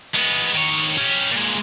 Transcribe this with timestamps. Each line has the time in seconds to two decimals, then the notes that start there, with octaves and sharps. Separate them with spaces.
0.15 G#3 B3
0.55 D#3 C#5
0.98 C#4 G4
1.31 A#2 G#3